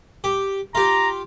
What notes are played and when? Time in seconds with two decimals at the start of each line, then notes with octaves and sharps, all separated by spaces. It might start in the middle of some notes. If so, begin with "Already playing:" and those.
0.24 G4
0.75 F4 G4 A#5